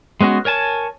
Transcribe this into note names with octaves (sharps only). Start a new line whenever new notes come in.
G#3 B3 C#4 F#4
A#4 C#5 G#5 A5